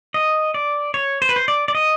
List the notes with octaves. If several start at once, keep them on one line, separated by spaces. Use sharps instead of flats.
D#5
D5
C#5
C5
B4
C5
D5
D5
D#5